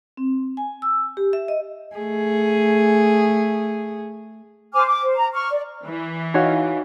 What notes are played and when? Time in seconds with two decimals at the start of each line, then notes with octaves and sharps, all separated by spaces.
0.17 C4
0.57 G#5
0.82 E6
1.17 G4
1.33 E5
1.48 D#5
1.96 A3 G#4
4.72 C5 G#5 D6 F6
4.86 D6
5.01 C5
5.14 A#5
5.32 C#6 F6
5.49 D5
5.86 E3
6.34 D#4 F#4 C#5 F5 G#5